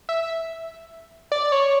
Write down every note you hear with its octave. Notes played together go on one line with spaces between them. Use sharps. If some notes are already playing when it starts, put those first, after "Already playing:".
E5
D5
C#5